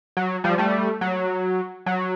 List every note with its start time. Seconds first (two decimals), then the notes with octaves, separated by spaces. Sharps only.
0.17 F#3
0.44 F3 G3
0.58 G3 A3
1.01 F#3
1.86 F#3